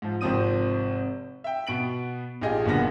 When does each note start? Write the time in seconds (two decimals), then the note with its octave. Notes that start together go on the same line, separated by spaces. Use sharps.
0.02 G#2 F3
0.21 G#1 C3 F3 C4 D#6 D#7
1.44 E5 G5
1.67 B2 B3 D7 F#7
2.42 A#1 F4 G4 G#4 D#5
2.65 F#1 A#2 D3 B3 A#6